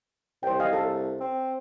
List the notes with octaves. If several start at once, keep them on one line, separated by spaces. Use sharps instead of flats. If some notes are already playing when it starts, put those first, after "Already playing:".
C2 C5 G5
D#5 F5 G#5
A4
C4